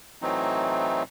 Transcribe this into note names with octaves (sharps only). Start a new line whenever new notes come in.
A2 E3 F#3 A3 C4 D#4